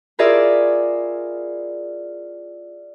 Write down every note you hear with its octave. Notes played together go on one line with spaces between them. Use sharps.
E4 F4 G#4 A#4 D5 E5